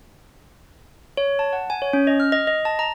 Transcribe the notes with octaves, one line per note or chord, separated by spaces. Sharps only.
C#5
A5
F#5
G#5
C#5
C#4
D#5
F6
D#5
D#5
A5
A#5